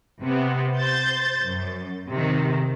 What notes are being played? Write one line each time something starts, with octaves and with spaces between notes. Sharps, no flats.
C3 B3
C5 G6 A6
F#2
C3 D#3